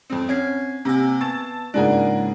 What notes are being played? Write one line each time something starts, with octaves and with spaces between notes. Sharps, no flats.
F2 C4
C4 C#4 G#6 C7
C3 A#3 C4 G#5
B3 A5 A6
G#2 C#3 A#3 D4 F4 G#4 A#4 F#5